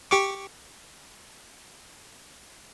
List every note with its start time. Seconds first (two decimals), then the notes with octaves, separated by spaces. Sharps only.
0.11 G4 C#6 D6